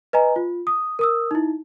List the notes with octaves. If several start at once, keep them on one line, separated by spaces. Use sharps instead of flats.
B4 D#5 G#5 A#5
F4
D#6
A#4 D#6 E6
D#4 E4